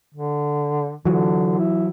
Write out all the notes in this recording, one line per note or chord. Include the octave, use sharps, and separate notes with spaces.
D3
D3 E3 F#3
E4